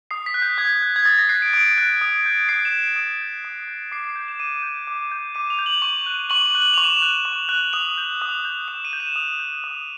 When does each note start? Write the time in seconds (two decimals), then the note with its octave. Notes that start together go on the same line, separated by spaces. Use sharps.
0.11 D#6 C7
0.26 B6
0.34 F#6
0.42 G6
0.58 D#6 G#6
0.82 F#6
0.96 G#6
1.05 D#6 A6
1.19 A#6
1.29 F#6 C7
1.42 D7
1.53 D#6 D7
1.78 F#6
2.01 D#6
2.26 G6
2.49 D#6 C7
2.65 E7
2.73 G6
2.81 D7
2.96 D#6
3.21 G6
3.45 D#6
3.68 G6
3.92 D6 C7
4.04 C7
4.16 G6
4.28 E7
4.40 D6 D#7
4.63 G6
4.87 D6
5.11 G6
5.35 D6 D#7
5.50 F7
5.59 G6
5.66 F#7
5.82 C#6
6.06 F#6
6.30 C#6 F#7
6.46 F#7
6.55 F#6
6.61 F#7
6.74 C#6 F7
6.84 E7
6.96 F7
7.02 F#6
7.25 C#6
7.49 F#6
7.73 D#6 F7
7.98 G6
8.22 D#6
8.45 G6
8.68 D#6 E7
8.85 D#7
8.93 G6
9.00 E7
9.16 D#6 F7
9.40 G6
9.64 D#6